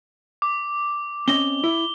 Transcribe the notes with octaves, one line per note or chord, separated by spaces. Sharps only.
D6
C4 C#4 D#5 G7
E4